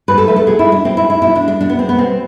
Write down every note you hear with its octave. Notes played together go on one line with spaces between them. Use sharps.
G#2 B4
A4
F3 A3 B4
A4
B2 G#4
E4
G#3
D4
B2 C4
E4
G#3
E4
B2 E4
D4
G#3
D4
B2 D4
B3
G#3 C4
B3
B2 C4